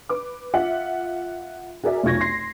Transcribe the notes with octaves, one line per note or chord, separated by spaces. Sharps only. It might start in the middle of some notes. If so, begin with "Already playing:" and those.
B4 D6
F4 E5 F#5
F#4 G#4 A#4 D5 E5
F1 B1 F4 C#6 G#6 A#6
C6 A#6 C7